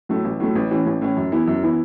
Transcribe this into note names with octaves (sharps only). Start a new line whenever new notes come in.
A2 F#3 A3
A1
A2 F#3 A3
A1
A2 E3 C#4
A1
A2 E3 C#4
F#2
E3 B3 E4
F#2
E3 B3 E4